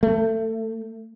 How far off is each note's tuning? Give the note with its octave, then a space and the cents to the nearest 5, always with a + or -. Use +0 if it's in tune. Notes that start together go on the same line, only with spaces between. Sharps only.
A3 +25